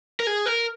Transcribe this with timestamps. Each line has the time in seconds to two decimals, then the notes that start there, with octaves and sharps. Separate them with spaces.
0.20 A#4
0.27 G#4
0.46 A#4